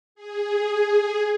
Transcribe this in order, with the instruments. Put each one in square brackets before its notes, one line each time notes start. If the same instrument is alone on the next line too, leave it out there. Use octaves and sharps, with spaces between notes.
[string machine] G#4